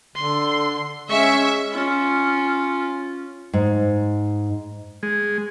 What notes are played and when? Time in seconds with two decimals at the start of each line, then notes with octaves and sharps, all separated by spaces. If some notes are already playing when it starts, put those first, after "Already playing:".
0.16 D3 C6
1.10 G#3 C#4 E5 C#6
1.72 C#4 F4
3.53 G#2
5.03 G#3